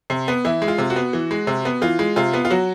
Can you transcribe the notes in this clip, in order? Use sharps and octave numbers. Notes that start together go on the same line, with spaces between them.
C3
B3
E3 E4
G#3
F4
C3
F#4
B3
E3
G#3
C3
B3
E3 F4
G#3
C3 F4
B3
F4
F#3 F#4